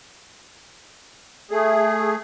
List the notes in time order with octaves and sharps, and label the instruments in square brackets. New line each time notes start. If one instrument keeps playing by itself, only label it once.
[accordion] A3 G#4